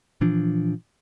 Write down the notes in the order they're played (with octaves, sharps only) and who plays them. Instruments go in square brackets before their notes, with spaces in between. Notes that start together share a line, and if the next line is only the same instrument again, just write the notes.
[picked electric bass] A#2 E3 F3 D4